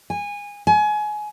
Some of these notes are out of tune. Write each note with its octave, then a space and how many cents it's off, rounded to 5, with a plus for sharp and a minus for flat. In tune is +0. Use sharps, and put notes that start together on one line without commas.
G#5 -20
G#5 +25